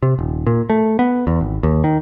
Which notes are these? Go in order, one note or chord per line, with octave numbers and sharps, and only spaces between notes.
C3
D#1
A#2
A3
B3
E2
G#1
D#2
D#3